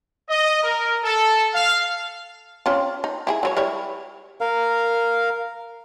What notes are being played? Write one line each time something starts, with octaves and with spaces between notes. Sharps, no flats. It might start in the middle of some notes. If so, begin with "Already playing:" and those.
D#5
A#4
A4
F5
C4 C#4 F4
D#4
E4 G4 G#4
F#3 F4 C#5
G3 E4 C#5
A#4 F5